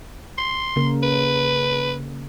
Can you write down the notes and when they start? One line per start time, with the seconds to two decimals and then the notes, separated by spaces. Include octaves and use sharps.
0.38 C6
0.76 C#3 A#3 A#4
1.03 B4